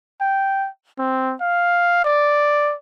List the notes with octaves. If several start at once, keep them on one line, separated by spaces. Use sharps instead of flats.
G5
C4
F5
D5